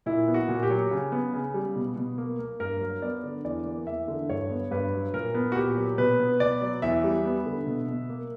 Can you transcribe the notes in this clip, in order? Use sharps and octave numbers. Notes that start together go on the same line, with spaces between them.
A#2 E4
B3
F#4
A#2
G4
F#3
C#3
B3
C#3
G3
B2
B2
A#3
A#3
G2 A#4
F#3
B3 D5
D3
E2 D5
A#3
E2 E5
D3
G2 C#5
B3
G2 B4
F#3
A#2 A#4
B3
F#4
A#2 G4
F#3
B2 B4
B3
B2 D5
F#3
E2 E5
G3
B3
D3
B2
B2
A#3